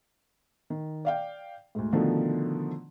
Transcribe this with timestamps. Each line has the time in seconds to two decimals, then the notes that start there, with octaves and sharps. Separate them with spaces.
0.70 D#3
1.05 D5 F5 G5
1.75 D2 G#2
1.92 B2 D3 D#3 F3 A3